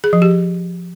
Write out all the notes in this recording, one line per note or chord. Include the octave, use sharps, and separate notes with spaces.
G#4
F3
G4